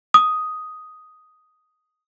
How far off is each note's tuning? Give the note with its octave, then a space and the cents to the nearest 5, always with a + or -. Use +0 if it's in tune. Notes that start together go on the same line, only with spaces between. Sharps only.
D#6 +5